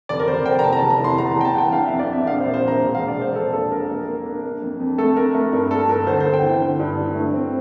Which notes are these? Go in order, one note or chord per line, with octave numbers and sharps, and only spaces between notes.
F1 D5
A#4
F1 C5
F1 G5
A#5
E2 A5
A#5
A5
F1
A#5
E3 C6
E2 A#5
A5
A#5
E2 G5
A5
E2 G5
D4 F5
E5
F2
D5
F2 E5
A#1 F5
C5
A#2
C5
A#1
A#5
E1
F5
E1
D5
E1 C5
A#1 A4
A#2 A4
A#1 A#4
A#3
A#3
D4
A#3
F2
F2
A3 A4
D4 A#4
A3 A#4
G2 A#4
A#3 A4
G2 A#4
D2 C5
C5
D2
G5
E3
D3
G2
D3
A3
C4